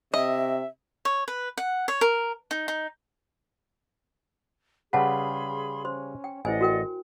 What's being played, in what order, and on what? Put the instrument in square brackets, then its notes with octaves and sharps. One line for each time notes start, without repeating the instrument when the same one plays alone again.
[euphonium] C3 [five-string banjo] D#5 [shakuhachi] E5
[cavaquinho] C#5
B4
F#5
C#5
A#4
D#4
D#4
[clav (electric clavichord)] C#3 G3 B4 [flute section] G#4 B5 C6 [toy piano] F#5 A5
[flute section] C#4 [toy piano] C5 C6
[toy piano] G5
[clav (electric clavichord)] A1 [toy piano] E4 C5 G#5 [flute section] D5 D#5 F#5
[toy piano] F#4 A#4 G5